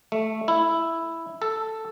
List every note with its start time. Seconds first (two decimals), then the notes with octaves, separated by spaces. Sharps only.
0.12 A3
0.48 E4
1.42 A4